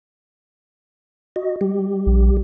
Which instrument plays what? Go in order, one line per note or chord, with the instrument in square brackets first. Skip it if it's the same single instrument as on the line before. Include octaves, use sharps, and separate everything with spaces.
[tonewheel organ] F#4 D#5
G3 G4
[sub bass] A#1